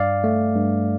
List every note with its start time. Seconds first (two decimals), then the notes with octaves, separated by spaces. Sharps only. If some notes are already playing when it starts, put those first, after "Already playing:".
Already playing: G2 D5 F5
0.24 A3
0.55 G2